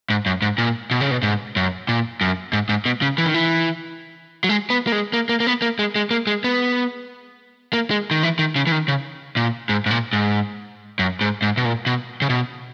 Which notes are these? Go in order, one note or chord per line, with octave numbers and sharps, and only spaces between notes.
G#2
F#2
G#2
A#2
B2
C#3
B2
G#2
F#2
A#2
F#2
G#2
G#2
B2
C#3
E3
D#3
E3
F#3
G#3
B3
A#3
G#3
A#3
A#3
A#3
B3
A#3
G#3
G#3
A#3
G#3
B3
A#3
G#3
D#3
E3
D#3
C#3
E3
D#3
C#3
A#2
G#2
G#2
A#2
G#2
F#2
G#2
G#2
B2
A#2
B2
C#3
B2